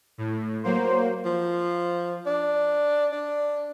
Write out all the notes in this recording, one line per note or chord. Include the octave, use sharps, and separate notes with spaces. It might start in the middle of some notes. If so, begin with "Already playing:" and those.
A2
F#3 A#3 C5
F3
D4
D4